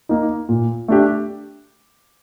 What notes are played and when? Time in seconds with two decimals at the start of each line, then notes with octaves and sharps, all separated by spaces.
0.09 A#3 D#4
0.49 A#2
0.88 A3 D4 G4